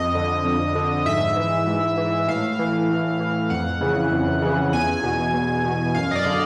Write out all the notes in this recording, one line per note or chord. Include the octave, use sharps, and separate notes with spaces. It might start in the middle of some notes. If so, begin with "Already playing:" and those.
Already playing: F2 D#5
D3
F2
D3
G#2 E5
E3
G#2
E3
A2 F5
E3
A2
E3
F2 F#5
C#3 E3
F2
C#3 E3
E2 G#5
B2
E2
B2
F#2 F5
D#5
D5
D3